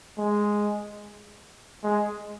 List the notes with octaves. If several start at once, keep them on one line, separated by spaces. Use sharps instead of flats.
G#3
G#3